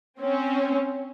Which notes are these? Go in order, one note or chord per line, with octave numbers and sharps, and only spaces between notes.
C4 C#4